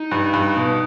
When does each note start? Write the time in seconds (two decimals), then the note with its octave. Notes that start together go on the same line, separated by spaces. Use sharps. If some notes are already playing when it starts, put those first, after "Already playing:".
Already playing: D#4
0.11 G2
0.33 G2
0.56 B2